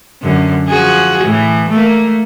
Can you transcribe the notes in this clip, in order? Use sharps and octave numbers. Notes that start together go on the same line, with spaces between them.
F#2 D3
F3 F#4 G#4
A2 E3
A3 A#3